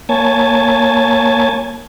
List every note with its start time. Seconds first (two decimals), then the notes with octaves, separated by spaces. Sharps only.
0.09 A#3 C#5 G#5 A5